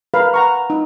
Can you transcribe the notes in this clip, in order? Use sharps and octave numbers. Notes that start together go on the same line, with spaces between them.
A#4 B4 F5 B5
F#5 A#5 C#6
D#4